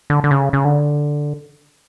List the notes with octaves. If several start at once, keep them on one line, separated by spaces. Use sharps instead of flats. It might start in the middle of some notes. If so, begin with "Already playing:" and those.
D3
D3
C#3
C#3
D3